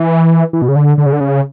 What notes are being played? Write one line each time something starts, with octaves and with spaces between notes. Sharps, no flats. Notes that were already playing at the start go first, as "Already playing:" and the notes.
Already playing: E3
E3
B2
C#3
D3
D3
C#3
D3
C#3